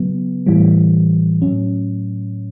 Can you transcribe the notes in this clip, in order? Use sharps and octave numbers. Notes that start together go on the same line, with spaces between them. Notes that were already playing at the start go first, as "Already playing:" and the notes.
Already playing: C#3 F#3 B3
A2 E3 G3
A2 F#3 C#4